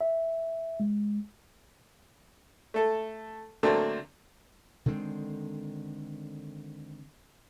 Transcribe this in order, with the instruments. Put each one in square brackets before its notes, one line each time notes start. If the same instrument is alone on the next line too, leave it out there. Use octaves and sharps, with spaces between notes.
[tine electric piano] E5
G#3
[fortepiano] A3 A4
D3 F#3 A3 A#3 C4 D4
[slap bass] D3 D#3 G#3 C4